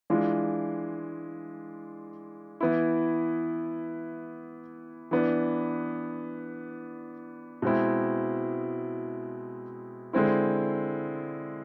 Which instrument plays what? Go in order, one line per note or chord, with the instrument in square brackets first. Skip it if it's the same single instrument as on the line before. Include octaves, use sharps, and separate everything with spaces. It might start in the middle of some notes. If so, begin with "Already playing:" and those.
[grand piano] E3 G#3 D4 F4
E3 B3 E4
E3 B3 D4
B2 G#3 C4 E4
D3 G#3 C4 E4